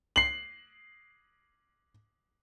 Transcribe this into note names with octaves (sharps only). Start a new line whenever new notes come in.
C7 F#7